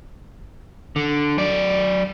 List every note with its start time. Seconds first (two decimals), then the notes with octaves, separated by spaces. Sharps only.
0.96 D3
1.38 F#3 D5